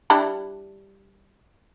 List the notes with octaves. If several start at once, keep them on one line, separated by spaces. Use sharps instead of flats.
G3 D4 E4